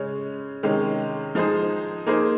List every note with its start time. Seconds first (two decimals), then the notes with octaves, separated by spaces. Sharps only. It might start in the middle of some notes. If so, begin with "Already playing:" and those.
Already playing: C#3 G#3 C#4
0.63 C3 D#3 G#3 C#4
1.35 F3 G#3 D#4 G#4 C5
2.06 A#3 D#4 G#4 C5